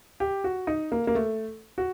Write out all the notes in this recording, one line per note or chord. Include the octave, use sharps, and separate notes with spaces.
G4
F#4
D#4
A#3
A#3
A3
F#4